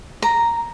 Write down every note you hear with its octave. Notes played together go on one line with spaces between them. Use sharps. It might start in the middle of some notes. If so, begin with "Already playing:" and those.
A#5